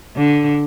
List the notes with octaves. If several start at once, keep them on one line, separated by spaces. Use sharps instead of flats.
D3